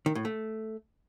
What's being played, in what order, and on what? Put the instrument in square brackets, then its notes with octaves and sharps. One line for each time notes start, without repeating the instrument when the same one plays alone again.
[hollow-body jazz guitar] D#3
A2
A3